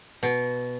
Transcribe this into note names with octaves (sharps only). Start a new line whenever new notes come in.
B2